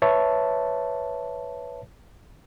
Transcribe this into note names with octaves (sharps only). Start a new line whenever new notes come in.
B4 C#5 E5 A5